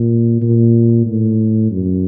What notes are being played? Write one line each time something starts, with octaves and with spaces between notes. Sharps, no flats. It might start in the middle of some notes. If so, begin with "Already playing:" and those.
Already playing: A#2
A#2
A2
F#2